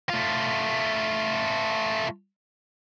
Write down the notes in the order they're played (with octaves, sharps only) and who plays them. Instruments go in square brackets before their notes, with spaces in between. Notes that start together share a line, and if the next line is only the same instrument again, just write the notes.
[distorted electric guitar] A3 F4